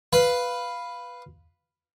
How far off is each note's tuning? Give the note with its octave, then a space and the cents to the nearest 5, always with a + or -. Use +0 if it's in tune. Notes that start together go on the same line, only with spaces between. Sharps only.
B4 +0 F5 +0